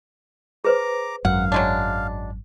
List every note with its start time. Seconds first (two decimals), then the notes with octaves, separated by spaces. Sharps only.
0.64 G#4 B4 C5 A#5 D6
1.25 G#1 F#2 F5 F#5
1.52 F#3 G#3 D4